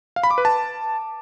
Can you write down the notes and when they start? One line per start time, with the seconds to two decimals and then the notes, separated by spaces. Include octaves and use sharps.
0.16 F5
0.23 B5
0.31 D6
0.38 B4
0.45 A5